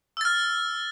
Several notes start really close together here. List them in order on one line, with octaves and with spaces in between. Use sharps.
E6 A6 F6